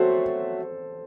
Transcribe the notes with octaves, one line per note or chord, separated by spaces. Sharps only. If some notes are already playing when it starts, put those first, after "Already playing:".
Already playing: F#3 A3 C4 F#4 A4 C5